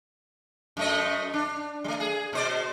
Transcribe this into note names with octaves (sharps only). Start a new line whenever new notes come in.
F#2 A3 D#5
D4
G3 A3
G#4
B2 C5 D5